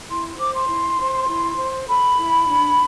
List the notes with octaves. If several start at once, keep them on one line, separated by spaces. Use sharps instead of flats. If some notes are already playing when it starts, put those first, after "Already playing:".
E4 C6
C5 D6
C6
E4
C5
E4
C5
A4 B5
E4
D4